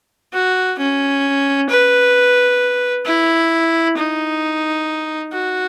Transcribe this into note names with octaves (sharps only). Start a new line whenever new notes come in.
F#4
C#4
B4
E4
D#4
F#4